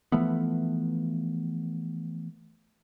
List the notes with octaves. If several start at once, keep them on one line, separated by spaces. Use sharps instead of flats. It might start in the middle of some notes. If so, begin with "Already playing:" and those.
E3 F3 A3 B3